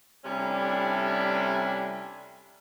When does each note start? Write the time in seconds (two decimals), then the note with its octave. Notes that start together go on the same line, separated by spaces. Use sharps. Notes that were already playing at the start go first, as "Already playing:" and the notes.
0.25 C3 G3 A3 C#4 D4 E4